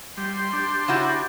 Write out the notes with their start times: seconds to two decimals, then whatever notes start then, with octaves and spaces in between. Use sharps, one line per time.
0.17 G3 C6
0.53 D4 G4
0.88 C#3 E4 F#4